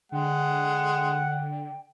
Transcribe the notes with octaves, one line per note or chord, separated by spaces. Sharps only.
D3 G#3 F#5 G5